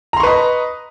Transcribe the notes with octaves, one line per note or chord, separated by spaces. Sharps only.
B4 D#5 A#5 C6 C#6